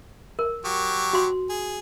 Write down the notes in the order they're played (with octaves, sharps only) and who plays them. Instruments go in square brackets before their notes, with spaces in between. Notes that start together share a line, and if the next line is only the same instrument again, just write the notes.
[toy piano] A#4
[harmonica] F#3 G4 C#6
[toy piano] F#4 C6
[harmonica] G#4